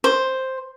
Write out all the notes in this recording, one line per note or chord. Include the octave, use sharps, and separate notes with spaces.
C5